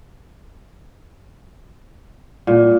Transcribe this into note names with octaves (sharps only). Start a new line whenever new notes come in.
A#2